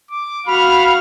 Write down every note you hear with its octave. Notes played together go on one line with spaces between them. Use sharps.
D6
F#4 F5 B5 F6